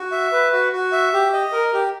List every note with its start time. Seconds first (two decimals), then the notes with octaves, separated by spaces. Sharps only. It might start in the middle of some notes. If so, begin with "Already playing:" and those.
Already playing: F#4
0.12 E5
0.32 B4
0.52 F#4
0.72 F#4
0.92 E5
1.13 G4
1.33 D#5
1.52 A#4
1.73 G4